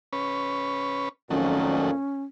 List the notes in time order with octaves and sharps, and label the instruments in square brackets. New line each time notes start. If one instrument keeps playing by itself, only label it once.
[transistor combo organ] C#4 B4
[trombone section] F2 A#2 [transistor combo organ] D#3 F#3 A3 [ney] C#4